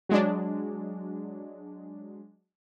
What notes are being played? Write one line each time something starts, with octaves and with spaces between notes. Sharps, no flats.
F#3 G#3 D4